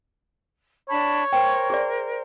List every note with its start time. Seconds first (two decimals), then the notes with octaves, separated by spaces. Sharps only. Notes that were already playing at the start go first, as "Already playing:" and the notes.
0.89 D4 C#5 A5 B5
1.33 A#4 C5 G5
1.70 G#4 D5